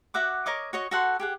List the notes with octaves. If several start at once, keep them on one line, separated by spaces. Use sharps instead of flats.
F#4 E5 F#5 D6
A#4 C#5 D#5 D6
F#4 C#5 D#5
F#4 A4 F#5 C6
G4 G#4 F#5